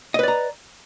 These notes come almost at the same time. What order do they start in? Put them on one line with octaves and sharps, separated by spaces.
D#5 B4 D5 A#5